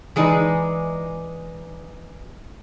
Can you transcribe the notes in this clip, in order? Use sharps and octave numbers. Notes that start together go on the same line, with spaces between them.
E3 G#3 D#4 D5